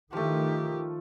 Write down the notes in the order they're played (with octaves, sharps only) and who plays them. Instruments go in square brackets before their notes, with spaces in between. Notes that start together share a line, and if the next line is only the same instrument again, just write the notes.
[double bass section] D#3 [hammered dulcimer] F3 A3 [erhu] G4